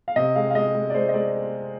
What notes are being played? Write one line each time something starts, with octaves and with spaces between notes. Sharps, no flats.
F5
C3 D#5
G#3 F5
F5
G#3 D#5
G#3
D5
G#3 C5
D#5
G#3 D5